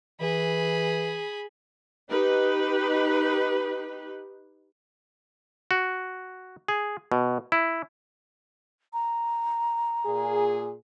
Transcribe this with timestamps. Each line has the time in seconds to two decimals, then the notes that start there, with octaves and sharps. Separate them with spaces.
0.21 E3 G#4 B5
2.09 D#4 G4 B4
5.71 F#4
6.68 G#4
7.12 B2
7.52 E4
8.93 A#5
10.06 A#2 G#4